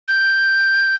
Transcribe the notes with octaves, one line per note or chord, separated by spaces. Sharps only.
G6